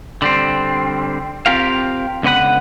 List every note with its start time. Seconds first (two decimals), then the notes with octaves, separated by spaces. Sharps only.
0.22 D3 G3 C4
1.46 C4 F4 G4 A#4 F5
2.23 C#2 D3 B3 B4 F#5